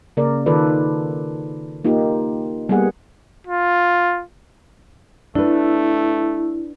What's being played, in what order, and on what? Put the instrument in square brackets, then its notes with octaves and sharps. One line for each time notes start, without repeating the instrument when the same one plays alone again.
[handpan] C#3 A#3 A#4 D5
D#3 F4 A4 B4 D5
A#3 D#4 F4 G4
G3 A#3 B3 G#4 F#5
[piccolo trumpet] F4
[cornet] A3 [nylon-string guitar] D4 B4 [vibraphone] E4